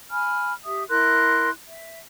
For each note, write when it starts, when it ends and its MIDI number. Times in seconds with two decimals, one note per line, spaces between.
0.11 0.53 80
0.11 0.53 83
0.11 0.53 89
0.65 0.84 67
0.65 0.84 76
0.65 0.84 87
0.89 1.50 64
0.89 1.50 70
0.89 1.50 84
0.89 1.50 90
1.68 1.99 76